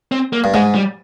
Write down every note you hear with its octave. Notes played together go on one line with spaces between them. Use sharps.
C4
A#3
G2
G#2 G#3
G3